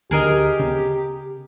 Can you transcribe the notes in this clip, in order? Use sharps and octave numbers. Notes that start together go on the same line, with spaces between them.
D2 D3 G4 G#4 A#4 D#5
C#3 B3 C#4